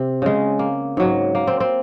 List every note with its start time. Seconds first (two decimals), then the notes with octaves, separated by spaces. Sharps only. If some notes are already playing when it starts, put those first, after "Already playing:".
Already playing: C3 C4
0.22 C#3 G#3
0.59 A#3
0.97 G#2 F#3
1.35 A#3
1.47 C4
1.60 C4